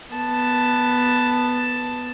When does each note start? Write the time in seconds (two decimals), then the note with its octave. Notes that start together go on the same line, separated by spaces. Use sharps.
0.13 B3 A5